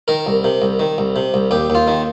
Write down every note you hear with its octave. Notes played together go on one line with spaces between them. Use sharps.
D#3 A#4
C2
C3
C2
D#3
C2
C3
C2
D#2 G4
D#2 F4
D#3